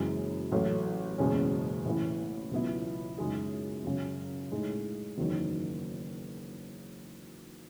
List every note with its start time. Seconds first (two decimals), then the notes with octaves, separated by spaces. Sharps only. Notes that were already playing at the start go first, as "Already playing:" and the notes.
Already playing: F#1 F#2 E3 G#3
0.52 A1 A2 F#3 A3
1.18 F#1 E2 B2 G#3 C#4
1.85 A1 A2 E3
2.51 C#2 B2 F#3 B3 E4
3.18 F#2 C#3 G#3 D#4 G#4
3.84 F#2 C#3 F#3
4.52 A2 G#3 D#4
5.18 F#1 E2 D#3 F#3